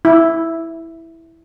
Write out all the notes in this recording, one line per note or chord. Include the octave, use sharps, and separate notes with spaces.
E4